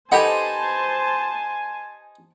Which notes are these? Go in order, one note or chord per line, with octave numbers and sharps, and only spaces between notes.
D#4 G4 A4 B4 C5 F#5 G#5 A5